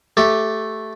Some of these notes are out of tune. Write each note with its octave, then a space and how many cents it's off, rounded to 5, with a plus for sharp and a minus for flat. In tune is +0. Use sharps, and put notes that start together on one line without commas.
A3 +0 G4 -10